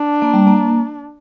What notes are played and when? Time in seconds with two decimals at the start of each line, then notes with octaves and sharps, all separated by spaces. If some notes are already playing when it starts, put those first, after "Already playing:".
Already playing: D4
0.22 A#3
0.34 G3
0.47 A#3